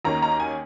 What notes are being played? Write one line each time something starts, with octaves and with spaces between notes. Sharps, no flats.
D#2 D#3 A#3 C#4 A#5
A#5
G#5